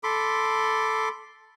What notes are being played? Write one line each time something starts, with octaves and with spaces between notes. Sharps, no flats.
A4 B5 C6 D6